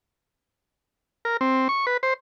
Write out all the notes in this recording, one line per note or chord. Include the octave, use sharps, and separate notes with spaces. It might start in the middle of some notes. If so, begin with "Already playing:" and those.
A#4
C4
C#6
B4
C5